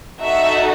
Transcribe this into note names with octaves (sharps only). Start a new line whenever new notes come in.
D#4 F#4 A4 E5